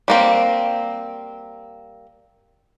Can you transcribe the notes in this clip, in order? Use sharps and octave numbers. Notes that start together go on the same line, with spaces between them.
G3 A#3 C4